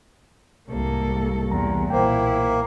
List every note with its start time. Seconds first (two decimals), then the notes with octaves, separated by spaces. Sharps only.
0.69 C2 G#2 A#3 A4
1.51 E2 A#5
1.90 B1 A#2 A#3 E4 C5 G5